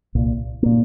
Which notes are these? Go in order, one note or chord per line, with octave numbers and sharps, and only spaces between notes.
C2 A#2
A#2 A#3